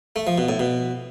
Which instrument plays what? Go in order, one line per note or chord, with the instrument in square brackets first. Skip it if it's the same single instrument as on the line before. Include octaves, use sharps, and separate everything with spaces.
[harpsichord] A3
F3
B2
A2
B2